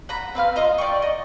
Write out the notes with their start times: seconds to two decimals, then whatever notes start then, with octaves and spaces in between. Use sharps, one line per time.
0.09 F#5 A#5 B5
0.35 C4 B4 F5 F6
0.56 F4 D#5 A#5
0.78 D5 G5 C#6
1.02 D#5